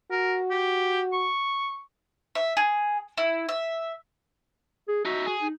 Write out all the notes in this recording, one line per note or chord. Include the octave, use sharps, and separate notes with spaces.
F#4 A#4
G4
C#6
E5
G#4
E4
E5
G#4
D#4 F#4 E5
G#4
D#4